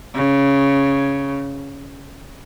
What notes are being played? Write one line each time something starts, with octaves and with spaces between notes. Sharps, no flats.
C#3